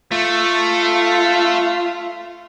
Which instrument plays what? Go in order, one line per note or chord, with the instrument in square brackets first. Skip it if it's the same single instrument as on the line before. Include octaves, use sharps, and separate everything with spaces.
[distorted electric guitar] A3 [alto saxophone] F4